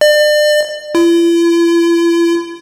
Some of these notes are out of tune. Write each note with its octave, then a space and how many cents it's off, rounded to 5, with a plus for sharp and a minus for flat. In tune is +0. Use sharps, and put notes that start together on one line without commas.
D5 +35
E4 +45